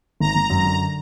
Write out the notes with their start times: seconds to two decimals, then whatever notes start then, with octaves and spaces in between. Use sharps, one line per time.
0.20 G#1 A#5
0.35 G#1
0.50 F#2
0.65 D3